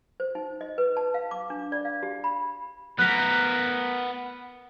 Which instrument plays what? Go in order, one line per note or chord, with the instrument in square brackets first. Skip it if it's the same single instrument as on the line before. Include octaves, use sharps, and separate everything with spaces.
[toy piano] C5
D#4
D#5
B4
A5
F5
D6
D4
D5
F5
G4
B5
[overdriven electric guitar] B3 A#4 [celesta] F#6 B6